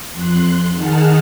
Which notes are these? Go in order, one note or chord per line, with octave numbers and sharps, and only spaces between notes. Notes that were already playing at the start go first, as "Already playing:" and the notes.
F2 C6 F#6
D#3 D#4 G#4 F#5 A5 F6